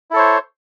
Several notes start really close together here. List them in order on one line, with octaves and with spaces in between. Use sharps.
E4 A4 C#5 C5